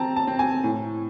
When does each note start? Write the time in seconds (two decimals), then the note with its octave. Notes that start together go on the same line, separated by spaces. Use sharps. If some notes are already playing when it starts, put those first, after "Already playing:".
Already playing: C4 A5 A#5
0.16 A5
0.27 C4
0.39 G#5
0.64 A2